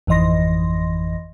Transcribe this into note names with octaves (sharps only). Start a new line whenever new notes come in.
G#1 F2 E3 D#5 C6 A#6